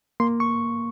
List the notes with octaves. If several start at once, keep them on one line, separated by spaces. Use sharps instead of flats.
A#3 C6
C#6